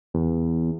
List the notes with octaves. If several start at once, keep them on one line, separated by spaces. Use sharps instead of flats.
E2